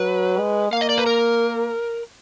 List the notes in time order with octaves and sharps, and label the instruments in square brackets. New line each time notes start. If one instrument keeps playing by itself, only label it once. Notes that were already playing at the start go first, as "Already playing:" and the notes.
Already playing: [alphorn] F#3 [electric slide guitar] B4
[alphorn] G#3
[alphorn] A#3 [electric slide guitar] F5
[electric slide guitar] D#5
D5
B4
A#4